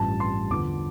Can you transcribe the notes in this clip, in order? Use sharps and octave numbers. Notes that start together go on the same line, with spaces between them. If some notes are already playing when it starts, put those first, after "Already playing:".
Already playing: A1 G2 F3 A5
C6
E2 D3 F3 B3 D6